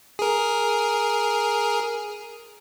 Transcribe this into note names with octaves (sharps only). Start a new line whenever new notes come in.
G#4 A#4